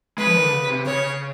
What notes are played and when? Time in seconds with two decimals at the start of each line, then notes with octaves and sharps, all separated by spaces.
0.18 G#3 B4
0.27 F3
0.35 D#3
0.44 D3
0.52 C#3
0.69 C3
0.86 C#3 C#5